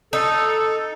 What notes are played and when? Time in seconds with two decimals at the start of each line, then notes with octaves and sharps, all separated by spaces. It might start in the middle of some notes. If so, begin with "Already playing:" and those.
0.13 D#4 A4